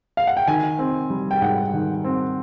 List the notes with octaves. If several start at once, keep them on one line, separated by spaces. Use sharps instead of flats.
F5
F#5
G5
D#3 G#5
C4
G3
G5
G#2 F#5
D#3
C4